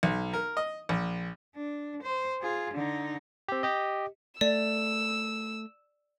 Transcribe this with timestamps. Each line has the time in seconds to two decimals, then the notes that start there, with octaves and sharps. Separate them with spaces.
0.03 B1
0.33 A#4
0.57 D#5
0.89 A#1
1.55 D4
2.02 C5
2.41 F4 G#4
2.74 D3 D#4
3.48 C4 G4
3.63 G4 D#5
4.41 A3 D5 E6